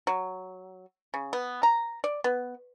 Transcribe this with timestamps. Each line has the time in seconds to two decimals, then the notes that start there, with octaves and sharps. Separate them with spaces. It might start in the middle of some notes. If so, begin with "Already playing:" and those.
0.07 F#3
1.14 C#3
1.33 B3
1.63 A#5
2.04 D5
2.24 B3